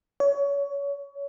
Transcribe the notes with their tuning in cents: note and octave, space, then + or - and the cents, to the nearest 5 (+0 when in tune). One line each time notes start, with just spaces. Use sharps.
C#5 +25